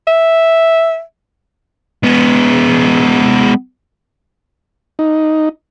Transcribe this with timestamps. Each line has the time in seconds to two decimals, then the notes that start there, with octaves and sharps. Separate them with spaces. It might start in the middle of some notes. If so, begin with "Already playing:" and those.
0.07 E5
2.04 G#3 B3
4.99 D#4